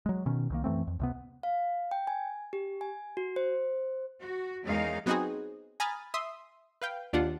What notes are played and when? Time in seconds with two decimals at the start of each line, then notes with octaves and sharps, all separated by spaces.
0.06 F#3 G#3
0.26 B2 D#3 C#4
0.50 C2 D#3 A#3
0.64 F#2 E3 A3 C4
0.87 F2
0.99 C#2 C3 B3
1.43 F5
1.91 G5
2.07 G#5
2.53 G4
2.81 G#5
3.17 F#4
3.36 C5
4.21 F#4
4.64 E2 D#3 G#3 C#4 D#4 F5
5.06 F#3 B3 C4 D#4 F#4 G#4
5.80 G#5 A#5 B5 D#6 F6 A6
6.14 E5 C6 D#6
6.82 B4 F5 G5
7.13 D#2 D4 F4 F#5